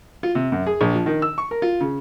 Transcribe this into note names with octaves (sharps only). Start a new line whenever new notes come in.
F4
C3
F#2
G#4
A#1
F3
D#3
E6
C#6
A#4
F4
C#3